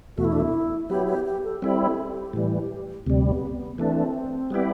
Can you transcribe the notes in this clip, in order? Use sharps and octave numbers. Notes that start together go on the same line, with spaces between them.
E2 B2 A3 F#4
E4
D4
E4
F#3 B3 E4 G4
G4
G4
A4
G3 C4 E4 A4
A4
G4
A2 E3 G3
D2 C3 G3 C4
B3
B3
E3 A3 C4 D4
G3 B3 E4 G4